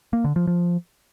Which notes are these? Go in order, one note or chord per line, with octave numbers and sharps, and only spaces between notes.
A#3
D3
F3
F3